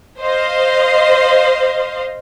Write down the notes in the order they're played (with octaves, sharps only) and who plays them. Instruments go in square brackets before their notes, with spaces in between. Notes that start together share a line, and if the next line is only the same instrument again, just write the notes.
[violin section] C5 D#5 F5 C6